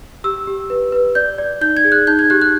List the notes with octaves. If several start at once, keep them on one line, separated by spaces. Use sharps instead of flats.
G4 E6
G4
B4
B4
D5 G6
D5
D#4 G6
G#6
G#4
F#6
D#4 G6
G#6
G4 F#6
F#6